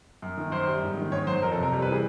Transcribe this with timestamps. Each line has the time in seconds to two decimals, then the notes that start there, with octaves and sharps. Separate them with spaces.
0.22 F#2
0.38 D#3
0.52 F#2 C5
0.67 G3
0.83 G#2
0.97 D#3
1.12 G#2 C#5
1.27 F#3 C5
1.42 F2 A#4
1.52 A4
1.57 C3
1.63 A#4
1.72 G3
1.82 B4
1.87 E3
1.92 G#4